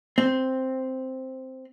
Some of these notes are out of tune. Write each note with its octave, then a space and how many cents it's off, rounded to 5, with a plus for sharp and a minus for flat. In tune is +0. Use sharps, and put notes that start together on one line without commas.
C4 +0